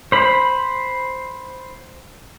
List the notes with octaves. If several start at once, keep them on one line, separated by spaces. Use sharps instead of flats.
C5 B5